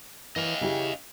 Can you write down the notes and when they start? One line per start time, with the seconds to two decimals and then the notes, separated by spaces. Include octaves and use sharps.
0.36 E3 D#5 F5
0.61 C#3 E4 G4